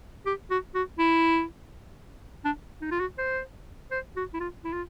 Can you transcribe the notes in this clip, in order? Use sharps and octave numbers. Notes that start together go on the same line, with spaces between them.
G4
F#4
F#4
E4
D4
D#4
F4
F#4
C5
C5
F#4
E4
F4
E4
F4